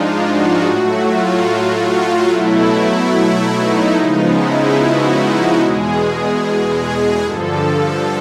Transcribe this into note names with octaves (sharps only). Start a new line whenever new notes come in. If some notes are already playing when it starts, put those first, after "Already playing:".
Already playing: G#2 F3 G#3 D4 D#4 F4
F#4
A2 F#3 A3
F4
F4
B2 F#3 A3 E4
D#4
C#3 F3 G#3 B3
E4
F#4
F#4
E2 B2 G#3 G#4
G#4
G#4
G2 D3 F3 A4